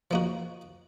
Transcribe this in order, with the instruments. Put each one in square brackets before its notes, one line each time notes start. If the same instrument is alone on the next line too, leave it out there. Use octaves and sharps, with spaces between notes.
[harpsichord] F3 A#3 D#4 F#4